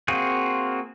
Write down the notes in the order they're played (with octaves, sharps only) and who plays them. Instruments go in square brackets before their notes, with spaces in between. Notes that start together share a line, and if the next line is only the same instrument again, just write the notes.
[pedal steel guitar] A#3 C4 F4 F#4 G#4